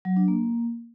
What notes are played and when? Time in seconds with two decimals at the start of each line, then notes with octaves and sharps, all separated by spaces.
0.05 F#3
0.17 D4
0.28 A#3